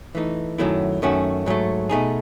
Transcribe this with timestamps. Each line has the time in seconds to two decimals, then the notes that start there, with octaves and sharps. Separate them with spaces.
0.15 E3 A3 D#4
0.58 F#2 D#3 F#3 A3 E4
1.02 F#2 D#3 A3 C#4 F#4
1.46 G#2 F#3 A3
1.89 B2 A3 D#4 G#4